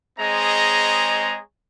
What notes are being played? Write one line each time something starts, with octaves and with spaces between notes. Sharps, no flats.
G#3 C4 G#4 C#5 D#5 A#5